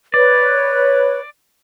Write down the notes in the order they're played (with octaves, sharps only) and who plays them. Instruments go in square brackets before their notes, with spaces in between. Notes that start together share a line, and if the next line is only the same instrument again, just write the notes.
[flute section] B4 C#5 [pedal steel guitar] D5